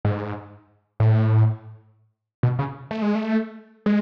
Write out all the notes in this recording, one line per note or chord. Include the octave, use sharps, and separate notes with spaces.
G#2
A2
B2
C#3
A3
G#3
A3
G#3